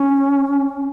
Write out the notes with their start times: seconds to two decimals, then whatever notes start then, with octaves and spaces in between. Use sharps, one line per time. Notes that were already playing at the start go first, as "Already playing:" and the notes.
Already playing: C#4